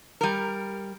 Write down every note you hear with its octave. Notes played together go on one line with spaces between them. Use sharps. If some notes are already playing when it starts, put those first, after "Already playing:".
G3 A#4